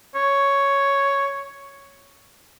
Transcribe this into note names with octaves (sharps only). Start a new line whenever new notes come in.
C#5